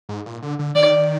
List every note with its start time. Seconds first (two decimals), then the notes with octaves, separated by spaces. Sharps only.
0.09 G#2
0.26 A#2
0.42 D3
0.59 D3
0.75 D#3 D5